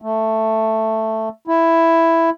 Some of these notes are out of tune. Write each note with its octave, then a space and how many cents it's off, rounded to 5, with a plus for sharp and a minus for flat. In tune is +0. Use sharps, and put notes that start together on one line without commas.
A3 +5
E4 +5